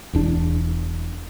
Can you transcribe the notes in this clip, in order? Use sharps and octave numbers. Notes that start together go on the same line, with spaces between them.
E1 E2 D4